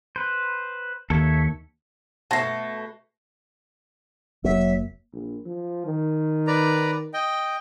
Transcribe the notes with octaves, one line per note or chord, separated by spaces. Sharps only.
B4 C5
D#2 A4 C#5 E5
B2 A3 A5 A#6 C7
F1 F#3 A#3 E5
A#1
F3
D#3
B4 D5 A#5
D#5 G5